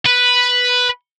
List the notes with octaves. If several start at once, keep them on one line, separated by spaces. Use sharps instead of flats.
B4